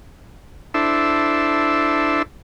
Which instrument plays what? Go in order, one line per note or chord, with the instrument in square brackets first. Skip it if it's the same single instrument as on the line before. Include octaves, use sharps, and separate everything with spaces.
[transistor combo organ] D4 E4 A4 C5 E5